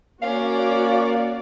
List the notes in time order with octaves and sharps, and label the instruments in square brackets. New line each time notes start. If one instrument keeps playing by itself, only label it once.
[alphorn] A#3 [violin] C#4 [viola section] F#4 D5 [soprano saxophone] F5